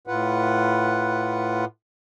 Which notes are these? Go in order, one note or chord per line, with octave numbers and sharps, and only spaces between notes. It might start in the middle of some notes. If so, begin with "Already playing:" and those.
A2 F4 B4 F#5